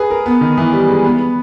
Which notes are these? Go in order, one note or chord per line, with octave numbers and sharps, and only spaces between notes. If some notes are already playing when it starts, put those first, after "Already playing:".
Already playing: G#4 B4
A#4
B3
D#3
E3
G3
G#3
B3